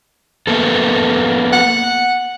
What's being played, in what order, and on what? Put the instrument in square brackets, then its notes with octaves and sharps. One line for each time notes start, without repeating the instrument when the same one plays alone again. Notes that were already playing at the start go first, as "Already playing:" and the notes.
[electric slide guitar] A#3 B3 A4
[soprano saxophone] F#5